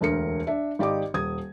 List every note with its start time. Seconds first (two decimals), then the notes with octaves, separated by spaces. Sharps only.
0.01 E1 D2 A#4 C#7
0.47 D4 E5
0.79 G#1 G4 D5 D#5 D6
1.14 D#1 D#6 G#6